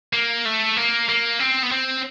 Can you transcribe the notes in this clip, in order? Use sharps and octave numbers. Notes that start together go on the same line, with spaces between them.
A#3
A3
A#3
A#3
C4
B3
C4